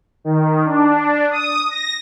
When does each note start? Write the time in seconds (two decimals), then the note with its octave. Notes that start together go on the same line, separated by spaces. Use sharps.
0.24 D#3
0.65 D4
1.31 D#6
1.70 A#6